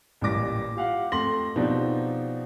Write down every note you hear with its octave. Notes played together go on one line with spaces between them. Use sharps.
A1 A#2 G3 D6 A#6
F4 G4 F5 F#5
F2 A3 C6 A#6 F#7
B2 F3 C4 D4 D#4 G4